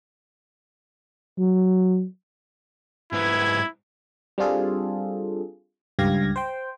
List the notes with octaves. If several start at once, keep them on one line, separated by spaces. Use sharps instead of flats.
F#3
G#2 B3 E4 G#6
G3 C4 D4 F4 G#4 A4
C#2 G2 G4 F5 G#6 A#6
C5 G5